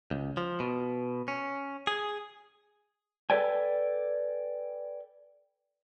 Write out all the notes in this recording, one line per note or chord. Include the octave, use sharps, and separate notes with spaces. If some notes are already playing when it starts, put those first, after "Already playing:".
C#2
F3
B2
C#4
G#4
A4 B4 D5 G5 G#5